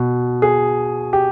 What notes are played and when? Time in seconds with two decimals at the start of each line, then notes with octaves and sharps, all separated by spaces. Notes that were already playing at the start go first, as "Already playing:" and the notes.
Already playing: B2
0.42 G#4
1.13 G4